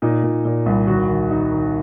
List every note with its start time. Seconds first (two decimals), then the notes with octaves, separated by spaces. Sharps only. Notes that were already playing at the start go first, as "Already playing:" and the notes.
0.02 A#2 D#4
0.23 A#2
0.45 A#2
0.66 C2
0.87 D#2 F#4
1.09 D#3
1.30 D#3 D#4
1.51 D#3